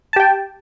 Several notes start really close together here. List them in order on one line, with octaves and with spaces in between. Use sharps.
A5 G4 G5